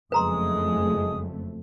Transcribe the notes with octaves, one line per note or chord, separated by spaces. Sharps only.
F#1 F2 G#3 A3 B4 A#5 C6 D#6